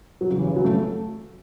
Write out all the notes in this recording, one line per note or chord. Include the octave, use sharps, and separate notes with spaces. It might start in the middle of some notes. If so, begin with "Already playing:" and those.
F#3
C#3
E3
C#3
F#3
A3